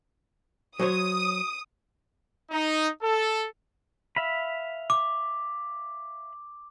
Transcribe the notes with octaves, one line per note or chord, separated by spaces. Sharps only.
F#3 C5 C#5 D#6
D#4
A4
E5 F5 B5
D6